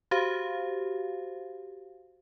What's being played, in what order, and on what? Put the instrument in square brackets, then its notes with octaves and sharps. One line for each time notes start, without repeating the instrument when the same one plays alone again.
[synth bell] F#4 G4 C5 F5